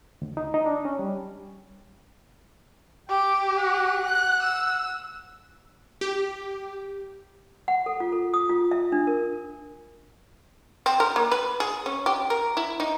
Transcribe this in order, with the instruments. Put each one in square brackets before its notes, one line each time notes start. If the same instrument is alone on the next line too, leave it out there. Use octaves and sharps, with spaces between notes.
[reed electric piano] D2
D#4
D#4
D4
C#4
G3
[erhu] G4 [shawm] G5
[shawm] F#5
[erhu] F#6
E6
[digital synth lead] G4
[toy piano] F#5
A4
F4
A4
D#6
F4
E5
D4
A#4
[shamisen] C4
A#4
A#3
B4
G#4
C#4
G4
A#4
E4
D#4